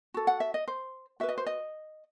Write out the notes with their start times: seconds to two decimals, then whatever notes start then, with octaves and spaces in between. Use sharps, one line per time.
0.14 F#4 A4
0.27 F#5
0.40 E5
0.54 D#5
0.68 C5
1.20 F#4 B4 E5
1.29 D#5
1.38 C5
1.47 D#5